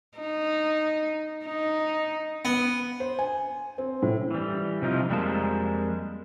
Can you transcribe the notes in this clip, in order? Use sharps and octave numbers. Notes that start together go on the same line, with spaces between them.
D#4
D#4
B3
C5
G#5
C4
A2
E3 G3
C3 F3 D#4 F4
F2 G3 G#3 A#3 A5